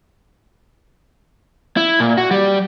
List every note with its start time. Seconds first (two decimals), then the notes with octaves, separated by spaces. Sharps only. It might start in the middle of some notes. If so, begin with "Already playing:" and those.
1.77 E4
2.00 A#2
2.18 F#4
2.31 G3